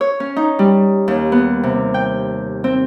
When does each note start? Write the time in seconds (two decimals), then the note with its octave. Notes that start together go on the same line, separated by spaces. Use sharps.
0.01 C#5
0.20 C#4
0.36 D#4
0.59 G3
1.08 D#2
1.32 B3
1.63 C3
1.94 G5
2.64 C4